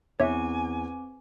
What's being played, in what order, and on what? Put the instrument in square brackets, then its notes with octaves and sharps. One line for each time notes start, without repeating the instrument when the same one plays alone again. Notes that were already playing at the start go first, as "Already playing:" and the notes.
[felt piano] E2 [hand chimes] C4 D6 [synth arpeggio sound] C#5 E5 [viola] G#5